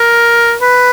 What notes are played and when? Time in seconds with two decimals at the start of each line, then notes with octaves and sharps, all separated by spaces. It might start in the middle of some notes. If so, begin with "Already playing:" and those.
Already playing: A#4
0.61 B4